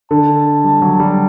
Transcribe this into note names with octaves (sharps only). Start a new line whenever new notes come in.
D3 A5
G3
F#3
G3